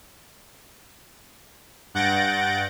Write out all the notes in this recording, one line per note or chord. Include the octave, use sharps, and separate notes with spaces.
G2 F#5 G6 A6 A#6 D7